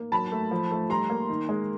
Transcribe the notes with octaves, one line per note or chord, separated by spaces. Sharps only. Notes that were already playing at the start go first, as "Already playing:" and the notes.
Already playing: A#3
F#3 A5 B5
A3
F3
A3
G3 A#5 C6
A#3
D#3
G#3